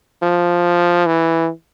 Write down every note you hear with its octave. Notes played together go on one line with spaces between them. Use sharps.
F3
E3